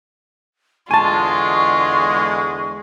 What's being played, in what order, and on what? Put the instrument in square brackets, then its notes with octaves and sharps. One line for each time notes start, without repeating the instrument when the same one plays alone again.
[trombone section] E2 D3 G#3 [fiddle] F4 [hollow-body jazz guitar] G#5 A5 [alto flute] C#6